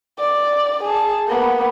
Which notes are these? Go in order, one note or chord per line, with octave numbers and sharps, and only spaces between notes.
D5
G#4 A5
A#3 B3